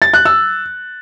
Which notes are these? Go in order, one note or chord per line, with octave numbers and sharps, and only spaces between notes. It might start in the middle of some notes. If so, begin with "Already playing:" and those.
A6
F#6
E6